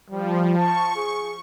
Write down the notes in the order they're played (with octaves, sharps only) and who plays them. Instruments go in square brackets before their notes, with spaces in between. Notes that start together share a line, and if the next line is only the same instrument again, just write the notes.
[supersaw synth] F3 [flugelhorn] G3
[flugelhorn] A5 [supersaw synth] C#6
[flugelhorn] G#4